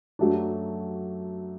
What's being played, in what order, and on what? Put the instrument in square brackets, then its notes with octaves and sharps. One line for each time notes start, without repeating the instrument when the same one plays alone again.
[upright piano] F#2 F#3 A3 D4